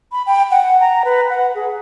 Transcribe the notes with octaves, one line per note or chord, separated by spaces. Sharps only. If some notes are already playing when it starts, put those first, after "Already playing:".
B5
G5
F#5
A#5
B4
F#5
G#4